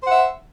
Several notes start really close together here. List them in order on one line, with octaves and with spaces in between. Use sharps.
C5 F#5 E5